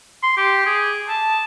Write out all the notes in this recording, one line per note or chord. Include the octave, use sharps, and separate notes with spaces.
C6
G4
G#4
A5